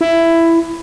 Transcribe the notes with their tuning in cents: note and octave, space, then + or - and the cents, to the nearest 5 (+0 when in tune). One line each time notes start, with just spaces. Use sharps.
E4 +10